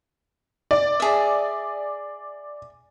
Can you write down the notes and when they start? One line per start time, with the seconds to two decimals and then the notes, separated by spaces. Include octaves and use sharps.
0.71 D5
1.00 G#4 E5